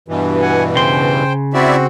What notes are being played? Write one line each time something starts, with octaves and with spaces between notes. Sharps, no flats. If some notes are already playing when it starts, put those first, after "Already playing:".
G2 B2 E3
F#5 G#5
C#3 C5 G5 C6
C4 E4 F#4 D5 E5